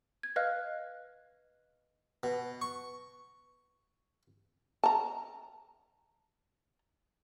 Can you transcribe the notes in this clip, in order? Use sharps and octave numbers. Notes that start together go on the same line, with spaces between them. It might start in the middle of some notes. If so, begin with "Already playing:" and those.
G#6
B4 D#5 F5 F6 F#6
B2
C#6
A5 A#5